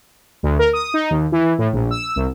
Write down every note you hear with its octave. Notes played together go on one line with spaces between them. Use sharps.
D2
A#4
D#6
D#4
D#2
E3
A2
A#1
E6
C2